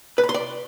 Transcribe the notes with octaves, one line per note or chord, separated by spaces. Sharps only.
B4
B5
C6
D5